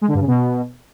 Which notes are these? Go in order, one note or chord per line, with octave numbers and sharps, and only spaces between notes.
G#3
D3
G2
C#3
B2